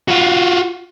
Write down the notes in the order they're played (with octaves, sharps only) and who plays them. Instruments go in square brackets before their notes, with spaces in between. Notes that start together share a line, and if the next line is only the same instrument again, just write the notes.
[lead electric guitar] F4 F#4